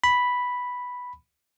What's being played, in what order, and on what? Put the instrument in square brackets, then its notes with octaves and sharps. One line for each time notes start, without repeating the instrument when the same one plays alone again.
[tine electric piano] B5